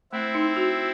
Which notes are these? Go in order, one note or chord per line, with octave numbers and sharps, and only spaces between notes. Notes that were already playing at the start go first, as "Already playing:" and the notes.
A3 C4 E4
D#4
F#4